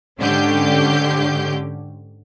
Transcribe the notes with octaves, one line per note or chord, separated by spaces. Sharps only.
G#2 D3 C#4 G4 G6